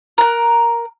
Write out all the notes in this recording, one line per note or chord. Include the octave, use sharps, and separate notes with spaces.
A#4 F#6